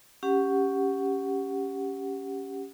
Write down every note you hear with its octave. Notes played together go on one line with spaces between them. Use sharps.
C#4 G4 F#5